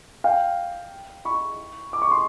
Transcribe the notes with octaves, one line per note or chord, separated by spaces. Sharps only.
F5 G5
B5 C#6
D6
C#6
C6